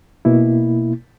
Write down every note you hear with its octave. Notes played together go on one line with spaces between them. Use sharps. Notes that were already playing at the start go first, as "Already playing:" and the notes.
B2 A#3 E4